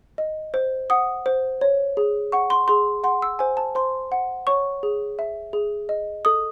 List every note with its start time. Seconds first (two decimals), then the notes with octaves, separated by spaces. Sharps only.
0.18 D#5
0.54 C5
0.90 F#5 D#6
1.26 C5
1.61 C#5
1.97 G#4
2.32 F#5 C#6
2.50 C6
2.68 G#4 C6
3.04 F#5 C6
3.22 E6
3.39 C5 G#5
3.57 A5
3.75 C5 C6
4.12 F#5
4.47 C#5 C#6
4.83 G#4
5.19 E5
5.53 G#4
5.89 D#5
6.25 A4 D#6